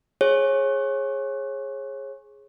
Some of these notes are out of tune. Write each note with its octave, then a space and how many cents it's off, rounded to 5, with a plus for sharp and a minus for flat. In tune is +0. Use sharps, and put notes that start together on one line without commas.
G#4 +5 C#5 -30